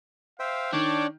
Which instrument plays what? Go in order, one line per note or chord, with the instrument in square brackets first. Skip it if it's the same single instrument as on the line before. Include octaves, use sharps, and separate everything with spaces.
[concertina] C5 E5 G5 [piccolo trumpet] F5
[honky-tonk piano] D#3 [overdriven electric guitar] D4 [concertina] C#5 G5 [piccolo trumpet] D6